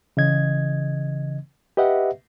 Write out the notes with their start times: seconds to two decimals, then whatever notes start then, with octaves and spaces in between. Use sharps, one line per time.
0.17 C#3 E3 D#5 G#6
1.77 G4 B4 D#5 E5 F#5